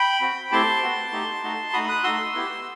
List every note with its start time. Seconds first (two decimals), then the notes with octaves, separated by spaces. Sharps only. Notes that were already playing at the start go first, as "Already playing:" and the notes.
Already playing: G5 B5
0.21 C4 F#4
0.52 A3 C4 E4 G4 A5 C6
0.83 B3 F#4
1.12 A3 D#4 G4
1.43 A3 D#4 F#4
1.73 A3 D#4 F#4 B5 D#6
1.89 D#6 F#6
2.04 A3 D#4 F#4 C6 E6
2.34 B3 E4 G4